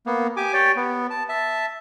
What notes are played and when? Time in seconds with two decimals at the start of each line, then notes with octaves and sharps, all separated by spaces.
0.06 A#3 B3
0.37 G4 G#5 D6
0.54 G4 C#5 D5 G5
0.76 B3
1.10 A5
1.29 E5 A5